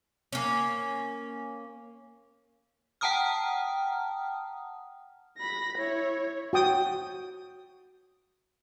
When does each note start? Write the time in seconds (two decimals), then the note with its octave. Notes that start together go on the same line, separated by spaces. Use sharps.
0.33 A#3 C#4
3.01 F#5 G5 A5 A#5 D#6 F6
5.37 B5 A#6
5.78 E4 C#5
6.53 F#4 G5 D#6